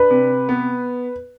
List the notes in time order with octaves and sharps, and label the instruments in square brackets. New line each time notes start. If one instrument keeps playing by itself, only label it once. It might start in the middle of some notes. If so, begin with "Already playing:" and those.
Already playing: [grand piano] D4 [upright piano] B4
[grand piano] C3
B3